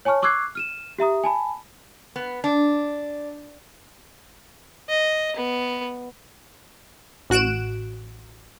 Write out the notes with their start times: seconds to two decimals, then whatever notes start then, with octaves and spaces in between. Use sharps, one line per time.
0.05 C#5 G#5 A5 C#6 F6
0.22 C#6 D6 E6 F#6 G#6 C7
0.55 F6 D#7 E7
0.99 G4 E5 A#5 D#6
1.24 G#5 A5 B5
2.16 B3
2.44 D4
4.89 D#5
5.36 B3
7.30 A1 F#4 F#6 D7 E7